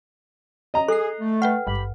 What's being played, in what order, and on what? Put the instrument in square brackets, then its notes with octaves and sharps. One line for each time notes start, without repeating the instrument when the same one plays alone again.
[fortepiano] D#5 A#5
[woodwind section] G#4 [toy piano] A4 [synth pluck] F#6 C7
[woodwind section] A3
[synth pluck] B4 G5 F6 [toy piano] F#5
[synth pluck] G#1 G2 [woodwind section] G4 B5